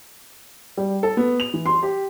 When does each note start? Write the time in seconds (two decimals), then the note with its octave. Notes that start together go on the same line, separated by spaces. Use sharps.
0.77 G3
1.03 A4
1.17 B3
1.40 F7
1.54 E3
1.66 C6
1.83 G4